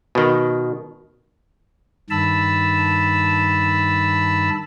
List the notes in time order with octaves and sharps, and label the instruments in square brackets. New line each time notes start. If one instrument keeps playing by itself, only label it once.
[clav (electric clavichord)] B2 D#3
[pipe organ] G2 D#3 A5 B5 E6